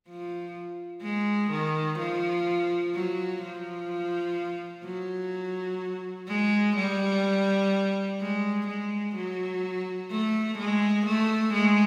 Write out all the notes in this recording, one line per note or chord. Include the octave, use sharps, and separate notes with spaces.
F3
G#3
D#3
F3
F#3
F3
F#3
G#3
G3
G#3
G#3
F#3
A3
G#3
A3
G#3